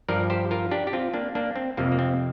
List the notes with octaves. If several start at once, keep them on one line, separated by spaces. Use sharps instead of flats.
G2 F3 A#4 D5
G4 C5
F4 A#4
D4 G4
G4
C4 F4
A#3 D4
A#3 D4
C4
F2 C3 F3 A#3
A#3
C4